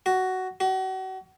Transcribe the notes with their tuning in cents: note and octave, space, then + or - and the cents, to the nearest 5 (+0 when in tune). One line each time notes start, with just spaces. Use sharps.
F#4 +10
F#4 +35